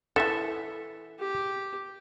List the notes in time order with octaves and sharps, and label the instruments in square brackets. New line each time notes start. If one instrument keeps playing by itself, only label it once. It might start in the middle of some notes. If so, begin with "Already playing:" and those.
[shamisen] D#3 E3 [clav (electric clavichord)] A4 E5
[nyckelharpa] G4